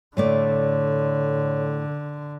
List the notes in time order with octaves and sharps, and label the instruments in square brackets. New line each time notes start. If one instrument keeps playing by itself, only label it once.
[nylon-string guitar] A2 A3 D5 [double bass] D3 [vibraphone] C#5